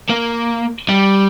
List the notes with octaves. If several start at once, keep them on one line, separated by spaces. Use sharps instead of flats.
A#3
G3